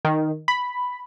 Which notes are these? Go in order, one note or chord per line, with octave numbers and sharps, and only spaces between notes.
D#3
B5